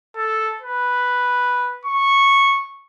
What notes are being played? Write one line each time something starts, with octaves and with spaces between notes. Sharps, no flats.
A4
B4
C#6